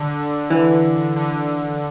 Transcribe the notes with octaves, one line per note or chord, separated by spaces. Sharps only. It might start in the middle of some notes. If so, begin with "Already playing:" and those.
Already playing: D3
E3
D3